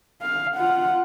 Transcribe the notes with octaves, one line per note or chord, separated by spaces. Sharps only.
F5
F4 F#5